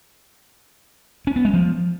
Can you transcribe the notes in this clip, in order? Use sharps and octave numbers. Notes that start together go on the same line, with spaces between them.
C#4
B3
G#3
F3